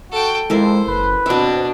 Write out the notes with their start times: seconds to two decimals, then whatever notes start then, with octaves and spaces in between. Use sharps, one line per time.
0.11 F#4 A4 G5
0.50 F2 G#3 E4 A4 A#4 C5
0.87 F#1 B4
1.26 B2 C4 D4 E5